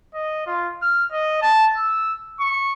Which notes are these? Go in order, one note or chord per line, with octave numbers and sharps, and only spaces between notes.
D#5
F4
F6
D#5
A5
E6
C#6